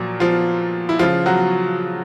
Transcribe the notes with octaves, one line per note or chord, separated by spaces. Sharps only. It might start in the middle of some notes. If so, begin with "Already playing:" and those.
Already playing: A#2 F3 F#3
F3 F4
E4
C#3 F3 F4
F#3 F#4